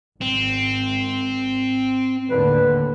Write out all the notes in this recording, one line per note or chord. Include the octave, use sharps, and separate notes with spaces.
G#1 C4
D#2 A2 D3 B4